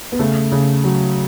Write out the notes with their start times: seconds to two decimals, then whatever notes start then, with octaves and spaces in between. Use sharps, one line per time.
0.12 B3
0.19 C#3 A3
0.52 C#3
0.84 F#3